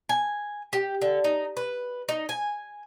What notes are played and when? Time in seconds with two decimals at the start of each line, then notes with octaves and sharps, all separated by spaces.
0.09 G#5
0.73 G4
1.02 D3
1.24 D#4
1.57 B4
2.09 D#4
2.29 G#5